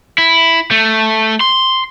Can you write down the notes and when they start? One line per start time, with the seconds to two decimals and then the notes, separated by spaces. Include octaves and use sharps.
0.18 E4
0.71 A3
1.40 C6